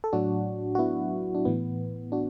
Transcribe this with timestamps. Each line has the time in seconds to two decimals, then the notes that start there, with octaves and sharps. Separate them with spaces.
0.04 A4
0.13 A2 F#3 D4 F#4
0.75 F#4
0.79 B3 E4
1.35 D4
1.45 A2 E3 B3
2.12 D4 F#4